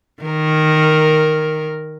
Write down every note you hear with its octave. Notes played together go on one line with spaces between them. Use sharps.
D#3 A#4